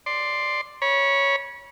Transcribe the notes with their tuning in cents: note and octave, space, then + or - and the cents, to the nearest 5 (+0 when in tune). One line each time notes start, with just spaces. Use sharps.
D5 +5 C6 +0
C#5 +0 B5 -35